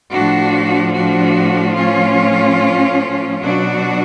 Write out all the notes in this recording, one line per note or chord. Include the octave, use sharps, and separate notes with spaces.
A2 F3 D4 F#4
D4 F#4
C#4 F4
B2 F#3 D4 F#4